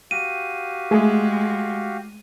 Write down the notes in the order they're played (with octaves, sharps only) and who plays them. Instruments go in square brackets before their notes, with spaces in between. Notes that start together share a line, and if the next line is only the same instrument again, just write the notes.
[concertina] F#4 G4 F5 [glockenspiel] D#7
[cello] G#3 [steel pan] A3 G#4